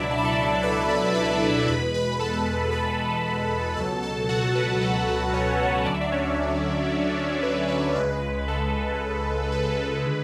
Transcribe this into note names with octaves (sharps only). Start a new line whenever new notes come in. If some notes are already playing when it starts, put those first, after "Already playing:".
Already playing: C#2 B2 F#3 D4 E4 D5 E5
A5
B5
A4 A5
B4 B5
A4 A5
B4 B5
E2 B2 G#3 B4 B5
B4 B5
A4 A5
B4 B5
C#2 B2 F#3 A4 A5
A4 A5
F#4 F#5
B4
B4
A4
B4
C#4 C#5
D2 D3 F#3 D5
E5
D4 D5
C#4 C#5
B4
B4
C#2 C#3 G#3 B4
A4
B4
A4
B4
D3 G#3